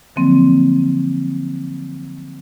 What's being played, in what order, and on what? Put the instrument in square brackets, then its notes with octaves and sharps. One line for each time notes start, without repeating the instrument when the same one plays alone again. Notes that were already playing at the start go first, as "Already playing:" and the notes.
[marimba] D3 F3 F#3 A#3 C4